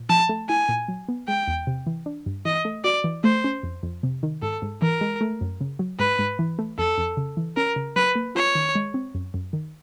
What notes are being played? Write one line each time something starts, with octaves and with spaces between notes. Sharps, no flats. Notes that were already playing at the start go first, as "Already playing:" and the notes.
Already playing: A#2
F3 A5
A3
E4 G#5
A#2
F#3
B3
G#3 G5
E2
C3
E3
D4
G2
E3 D#5
A3
F#4 D5
E3
A3 C5
C#4
F2
F2
C3
D#3
G#2 A4
G#2
E3 A#4
G#3
A3
F#2
C#3
F#3
G#2 B4
G#2
E3
A3
F2 A4
F2
C#3
E3
C#4 A#4
C#3
F#3 B4
A#3
F4 C#5
D#3
G#3
C4
F#2
F#2
D#3